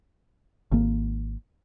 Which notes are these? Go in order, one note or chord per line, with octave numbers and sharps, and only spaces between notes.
G#1 A#3